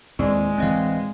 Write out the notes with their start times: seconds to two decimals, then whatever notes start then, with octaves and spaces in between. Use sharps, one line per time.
0.19 D#2 A2 G#3 C4 E4 D5
0.58 D2 E3 C4 D#5 F5